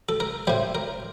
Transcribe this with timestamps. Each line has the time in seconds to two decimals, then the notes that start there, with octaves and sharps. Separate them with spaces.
0.09 A4
0.20 A#4
0.47 A2 G3 C5
0.75 A#4